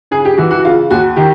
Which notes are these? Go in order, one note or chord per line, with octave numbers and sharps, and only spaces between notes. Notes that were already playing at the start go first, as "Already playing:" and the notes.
C#3 G#4
G4
E3 F#4
F#4
C#3 F4
D#2 F#4
D#3 G4